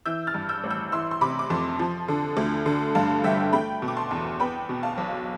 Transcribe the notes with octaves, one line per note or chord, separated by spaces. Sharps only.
E3 E6 G6
F6 A6
G2
E6 G6
A1
E6 G6
E3 C6 E6
C6
C3 B5 D6
D6
F2 A5 C6
F3
D3
D2
D3
G2 F5 A5
G1 E5 G5
A3 G5 B5
B2
D6
A5 C6
E2
B3 G5 B5
B2
F5 A5
B1